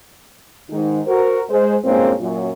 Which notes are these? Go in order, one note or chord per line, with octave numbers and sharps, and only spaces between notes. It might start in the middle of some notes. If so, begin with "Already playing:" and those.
G#2 D#3 D#4
F#4 A#4 C5
G#3 C5
G2 A#2 G#3 A#3 C4 C#4
F#2 A#2